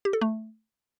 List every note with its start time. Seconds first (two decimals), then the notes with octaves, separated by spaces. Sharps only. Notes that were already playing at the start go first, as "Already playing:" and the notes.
0.05 G4
0.13 A4
0.21 A3